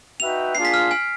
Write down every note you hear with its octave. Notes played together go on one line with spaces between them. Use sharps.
D#4 F#4 B4 E5 G5 F7
A#3 D4 F4 G#4 C7
B6
F6
G#5